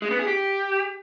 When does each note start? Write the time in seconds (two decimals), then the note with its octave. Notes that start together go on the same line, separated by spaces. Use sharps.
0.02 G#3
0.11 B3
0.19 G#4
0.28 G4